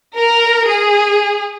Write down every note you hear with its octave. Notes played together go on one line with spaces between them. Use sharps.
A#4
G#4